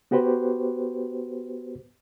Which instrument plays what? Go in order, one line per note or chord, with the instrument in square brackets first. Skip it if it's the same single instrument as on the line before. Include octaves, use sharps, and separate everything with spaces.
[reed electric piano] B3 F#4 G4 B4 C5